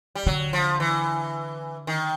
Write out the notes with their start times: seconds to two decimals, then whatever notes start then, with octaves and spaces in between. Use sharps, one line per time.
0.15 G3
0.26 D3 F#3
0.53 F3
0.80 E3
1.87 D#3